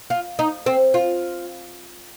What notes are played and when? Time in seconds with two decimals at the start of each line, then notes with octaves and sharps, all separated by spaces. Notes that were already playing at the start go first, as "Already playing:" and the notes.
0.10 F4
0.39 D#4
0.66 C4
0.94 F4